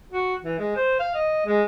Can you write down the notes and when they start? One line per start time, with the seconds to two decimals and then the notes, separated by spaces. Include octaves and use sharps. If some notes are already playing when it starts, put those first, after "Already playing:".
0.12 F#4
0.44 E3
0.59 G#3
0.76 C5
1.00 F5
1.14 D#5
1.46 G#3